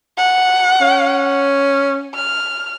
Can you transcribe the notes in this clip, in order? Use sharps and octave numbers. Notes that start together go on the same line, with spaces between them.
F#5
C#4
F6